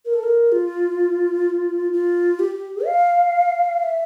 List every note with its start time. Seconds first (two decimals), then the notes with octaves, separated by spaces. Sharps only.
0.05 A#4
0.13 A4
0.23 A#4
0.52 F4
1.93 F4
2.39 G4
2.85 F5
3.79 F5
3.83 E5